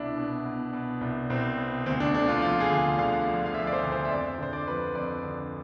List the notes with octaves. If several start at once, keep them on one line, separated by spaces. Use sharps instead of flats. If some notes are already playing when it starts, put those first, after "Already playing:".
Already playing: C2 B2 D4 E4
B2
B2
B2
C2
C2 C4
B2
D2 C4
D4
D3 D4
F4
F3 F4
G#4
D2
D3 F5
F3
F5
F3 E5
D5
C5
D2
C5
E5
F2 D5
D3 C5
D5
F3 B4
F2 D5
D3